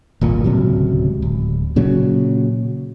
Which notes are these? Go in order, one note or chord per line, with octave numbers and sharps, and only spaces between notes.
D#1 G#1 A#2
D1 C#2 C3 F#3
D1
A#2 C#3 F#3